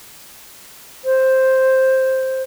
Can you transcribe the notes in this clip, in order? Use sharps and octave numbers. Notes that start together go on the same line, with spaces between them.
C5